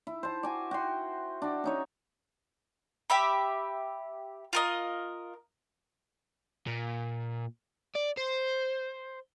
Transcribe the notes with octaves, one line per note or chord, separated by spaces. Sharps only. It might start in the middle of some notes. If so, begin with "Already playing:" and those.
E4
C5 A5
F#4 G#5 D6
F#4 G5 C6
D4 F#4
C#4 D#4 C#5
G4 E5 B5
F4 A#4 D#5
A#2
D5
C5